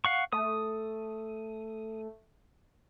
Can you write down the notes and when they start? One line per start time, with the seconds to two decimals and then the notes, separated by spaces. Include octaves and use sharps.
0.05 F5 F#5 C#6
0.32 A3 D#6